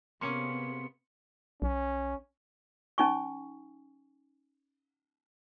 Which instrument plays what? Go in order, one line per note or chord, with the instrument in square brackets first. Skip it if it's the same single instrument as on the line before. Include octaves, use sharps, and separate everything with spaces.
[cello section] C3 B3 [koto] A#3 C#4 G#4 [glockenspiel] C6 C#7
[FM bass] B1 [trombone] C#4
[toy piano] C#4 D#4 G#5 C#6